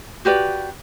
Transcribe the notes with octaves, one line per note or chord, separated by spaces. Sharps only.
F#4 G4 B4 D5